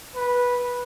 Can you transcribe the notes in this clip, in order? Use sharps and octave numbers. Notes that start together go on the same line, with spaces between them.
B4